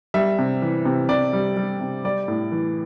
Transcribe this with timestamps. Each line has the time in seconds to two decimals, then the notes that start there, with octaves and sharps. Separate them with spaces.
0.14 G3 E5
0.39 C3
0.62 E3
0.85 C3
1.09 C3 D5
1.33 G3
1.57 G3
1.80 C3
2.04 G3 D5
2.28 A2
2.52 E3